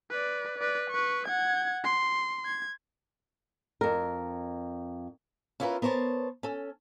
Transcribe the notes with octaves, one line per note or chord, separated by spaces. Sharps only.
B4 D5
B4 D5
B4 C#6
F#5 G#6
C6
G#6
F2 A#4
C#4 E4 F4 G4 A#4 B4
B3 A#4 C5 C#5 A5
C#4 A4